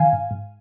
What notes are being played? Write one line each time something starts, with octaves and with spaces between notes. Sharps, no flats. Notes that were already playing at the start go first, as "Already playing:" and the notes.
Already playing: D#3 F5 G#5
G#2
G#2